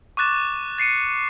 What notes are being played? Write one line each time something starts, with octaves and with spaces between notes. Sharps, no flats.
C#6 D6 F#6 A6 E7
A6 C7 C#7 D#7